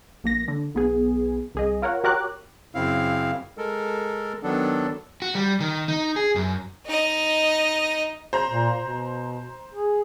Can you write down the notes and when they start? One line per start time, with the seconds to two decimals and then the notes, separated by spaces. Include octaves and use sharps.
0.24 A#1 A#3 A#6
0.48 D3
0.74 B1 B3 G#4
1.55 C2 G#4 D#5
1.82 F4 A#4 C#5 F#5
2.04 F#4 G4 A#4 C#5 D6 F#6
2.75 F#2 C#3 C4 E4 F5
3.58 G#3 A4 A#4
4.43 D#3 F#3 B3 D4 A4
5.22 F#4
5.35 G3
5.60 D#3
5.88 D#4
6.16 G#4
6.36 F#2
6.86 D#4 D#5
8.33 C5 A#5
8.51 A#2
8.80 B2
9.74 G#4